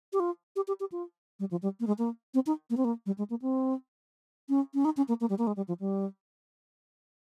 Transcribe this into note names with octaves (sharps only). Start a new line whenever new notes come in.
G4
F4
G4
G4
G4
F4
G3
F3
G3
A#3
G#3
A#3
C4
D#4
A#3
C4
A#3
G3
G#3
A#3
C4
C#4
C#4
D#4
C#4
A#3
A#3
G3
A#3
G#3
G3
F3
G3